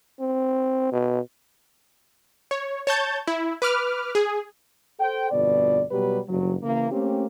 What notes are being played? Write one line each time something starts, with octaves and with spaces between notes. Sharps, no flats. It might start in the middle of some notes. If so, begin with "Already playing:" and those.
C4
B2
C#5
C#5 A5 G6 A6
E4
B4 D6 F6
G#4
A4 C5 G5
G1 F2 B2 D5
B2 F#3 G3 G4 B4
F#1 G2 F#3
C#3 E3 A#3
A3 A#3 C4 C#4 G4